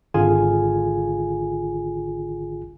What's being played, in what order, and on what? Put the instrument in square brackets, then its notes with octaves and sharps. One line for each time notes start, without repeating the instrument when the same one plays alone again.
[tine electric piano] G#1 D3 F4 G#4 G#5